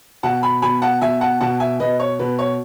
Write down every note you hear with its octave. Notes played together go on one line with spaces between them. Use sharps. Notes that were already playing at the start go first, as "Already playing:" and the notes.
B2 F#5 A5
G#5 B5
B2 G#5 B5
F#5 A5
B2 E5 G#5
F#5 A5
B2 F#5 A5
E5 G#5
B2 B4 D#5
C#5
B2 B4
C#5